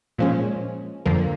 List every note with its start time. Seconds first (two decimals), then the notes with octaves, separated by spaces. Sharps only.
0.18 A#2 F3 G#3 C#4
1.05 F2 D3 F3 A#3